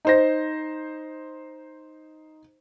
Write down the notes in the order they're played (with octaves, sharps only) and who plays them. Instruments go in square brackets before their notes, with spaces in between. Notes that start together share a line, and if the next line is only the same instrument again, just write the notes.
[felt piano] D#4 C5 A#6